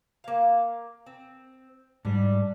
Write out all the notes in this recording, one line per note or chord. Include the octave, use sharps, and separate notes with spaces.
A#3 F5
C4
G#2 G3 D4